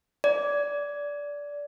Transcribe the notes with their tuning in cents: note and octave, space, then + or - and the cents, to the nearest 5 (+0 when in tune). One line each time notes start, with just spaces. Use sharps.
D5 -15